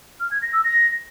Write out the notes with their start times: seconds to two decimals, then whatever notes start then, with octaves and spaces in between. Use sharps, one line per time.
0.20 F6
0.31 G#6
0.42 A#6
0.53 E6
0.64 A#6